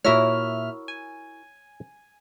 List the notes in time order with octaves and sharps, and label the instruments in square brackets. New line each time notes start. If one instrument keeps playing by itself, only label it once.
[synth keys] A#2 E5 F6 [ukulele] E4 F#4 A#4 [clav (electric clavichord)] C#5
[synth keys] G#5